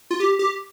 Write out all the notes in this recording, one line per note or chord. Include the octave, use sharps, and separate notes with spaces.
F4
G4
G4